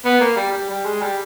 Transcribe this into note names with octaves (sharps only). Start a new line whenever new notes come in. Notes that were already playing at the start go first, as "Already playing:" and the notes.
B3
A#3
G3
G3
G3
G#3
G3